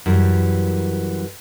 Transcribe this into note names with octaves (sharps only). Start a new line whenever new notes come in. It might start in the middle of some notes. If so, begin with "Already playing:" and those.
F#2 E3 G3